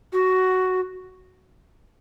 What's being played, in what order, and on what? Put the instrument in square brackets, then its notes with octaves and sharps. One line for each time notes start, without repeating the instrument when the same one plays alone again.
[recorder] F#4